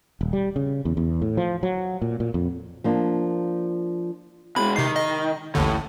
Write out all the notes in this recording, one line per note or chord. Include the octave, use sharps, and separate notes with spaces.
D#1
G3
C#3
E2
E2
A2
F3
F#3
A#2
A#2
F2
F3 A#3 D4
B2 G#3 B5
C3 D#3 C7
D#5
A1 D#2 A2 D3